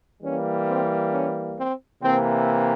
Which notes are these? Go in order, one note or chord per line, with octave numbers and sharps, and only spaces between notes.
E3 G3 A#3 C#4
C4
C#4
C4
C3 E3 A#3 C4